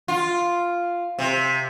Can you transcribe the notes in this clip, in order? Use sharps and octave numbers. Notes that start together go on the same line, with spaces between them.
F4
C3